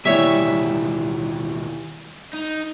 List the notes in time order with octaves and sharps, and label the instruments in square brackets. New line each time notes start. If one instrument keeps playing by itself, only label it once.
[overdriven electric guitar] D#2 B2 [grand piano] E3 G3 [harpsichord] C#5 E5
[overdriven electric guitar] D#4